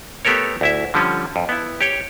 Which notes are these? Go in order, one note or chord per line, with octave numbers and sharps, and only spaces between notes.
A3 B3 G4 A4 A#4 C#5
D2 E4 E5
D3 F3 G3 C#4
F2
B3 E4
G4 C#5 G5